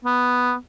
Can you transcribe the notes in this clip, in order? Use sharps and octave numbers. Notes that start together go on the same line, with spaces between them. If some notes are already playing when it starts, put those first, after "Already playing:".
B3